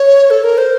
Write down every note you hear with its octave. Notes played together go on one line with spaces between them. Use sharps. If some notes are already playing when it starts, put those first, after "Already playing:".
Already playing: C#5
A4
A#4
C5